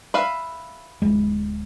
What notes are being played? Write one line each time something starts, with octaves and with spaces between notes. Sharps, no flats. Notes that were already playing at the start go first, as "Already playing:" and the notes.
B4 E5 F5
D1 G#3